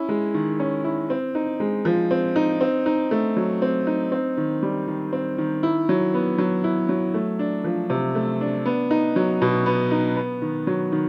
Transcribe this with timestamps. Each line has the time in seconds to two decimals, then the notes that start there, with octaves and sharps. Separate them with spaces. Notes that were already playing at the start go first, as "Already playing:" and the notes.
Already playing: C#4 E4
0.09 G#3
0.34 D#3
0.60 C#4
0.84 E4
1.10 C4
1.35 D#4
1.60 G#3
1.85 F3
2.11 C4
2.36 D#4
2.61 C4
2.86 D#4
3.11 A3
3.37 F#3
3.62 C4
3.87 D#4
4.12 C4
4.37 D#3
4.63 G3
4.87 D#3
5.13 C4
5.38 D#3
5.63 E4
5.89 F#3
6.14 B3
6.38 F#3
6.64 E4
6.89 F#3
7.14 A3
7.39 D4
7.64 F3
7.90 C3
8.15 A3
8.41 D4
8.66 B3
8.91 D#4
9.16 F#3
9.42 B2
9.66 B3
9.91 D#4
10.16 B3
10.42 D#3
10.67 F#3
10.92 D#3